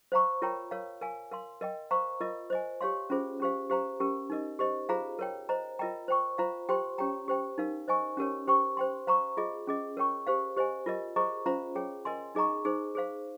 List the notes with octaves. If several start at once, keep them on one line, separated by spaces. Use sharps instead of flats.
C5 F5 A#5 C#6
F4 A#4 C#5 G5 A#5
A#4 C#5 F5
A#4 F5 G#5
A#4 F5 C6
A#4 D#5 G5
C5 F5 A#5 C#6
F4 A#4 D#5
C5 D#5 G#5
G4 C#5 F5 C6
C#4 F4 G#4 C5
C#4 G4 C5 F5
G4 C5 F5 A#5
C#4 G4 A#4
D#4 A#4 D#5
G4 C5 D#5
F4 G#4 C5 F5 A#5
A#4 C#5 G5
C5 D#5 A#5
F4 A#4 D#5 G5 A#5
C5 G5 C#6
F4 C5 F5 A#5
G4 C5 G5 C6
C#4 G4 C#5 G5 A#5
G4 C5 G5
D#4 A#4 F5
C5 D#5 G#5 C#6
C#4 G4 A#4 C#5
G4 C5 G5 C#6
C5 G5 C6
C5 F5 A#5 C#6
F4 G#4 D#5
C#4 G#4 D#5
A#4 C#5 G5 C#6
G4 C5 F5
G4 C5 D#5 G#5
F4 A#4 D#5
G#4 C5 D#5 A#5 C#6
C#4 F4 C5 F5 A#5
G#4 C#5 G5
A#4 D#5 G#5 C6
D#4 G#4 D#5 A#5 C#6
D#4 G#4 C5
G#4 C5 F5